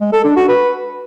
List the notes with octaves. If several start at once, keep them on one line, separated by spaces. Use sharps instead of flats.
G#3
A4
D4
F#4
B4